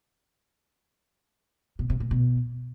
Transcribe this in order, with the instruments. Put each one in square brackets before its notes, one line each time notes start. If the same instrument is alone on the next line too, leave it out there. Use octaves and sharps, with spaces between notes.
[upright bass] B2
C3
A#2
B2